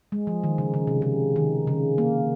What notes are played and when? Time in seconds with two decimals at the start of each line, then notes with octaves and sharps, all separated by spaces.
0.12 G#3
0.27 F3
0.44 D#3
0.58 C#3
0.74 C#3
0.87 C3
1.02 C#3
1.36 D#3
1.67 C#3
1.98 A#3